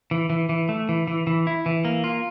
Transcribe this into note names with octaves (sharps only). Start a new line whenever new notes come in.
E3
E3
E3
A3
E3
E3
E3
E4
E3
A#3
F4